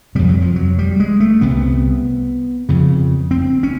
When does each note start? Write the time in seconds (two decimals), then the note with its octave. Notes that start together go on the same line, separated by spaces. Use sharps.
0.15 F2 C3 G3
0.29 F#3
0.42 F3
0.56 F#3
0.79 G3
1.00 G#3
1.20 A3
1.41 C2 C3 B3
2.69 F2 C#3
3.31 C4
3.63 C#4